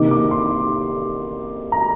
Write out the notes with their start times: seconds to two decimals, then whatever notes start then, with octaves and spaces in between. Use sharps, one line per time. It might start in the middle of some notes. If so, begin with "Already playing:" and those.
Already playing: C3 D#3 A#3 D#4 D6
0.11 D6
0.31 C6
1.72 A#5